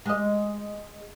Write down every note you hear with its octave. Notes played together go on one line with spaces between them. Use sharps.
G#3 D#5